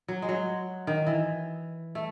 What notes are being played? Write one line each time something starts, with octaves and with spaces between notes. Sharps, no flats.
F#3
G#3
F#3
D#3
E3
A3